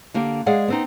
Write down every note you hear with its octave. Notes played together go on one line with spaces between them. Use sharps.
D3 A#3 G4
G#3 G#4 D5 F5 F#5
B3 C4 D#4